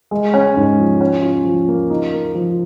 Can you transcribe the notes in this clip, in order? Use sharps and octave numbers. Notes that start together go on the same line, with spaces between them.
G#3
C#4
G#2
F3
C#4
F4
F3
A#3
D#4
A#4
F3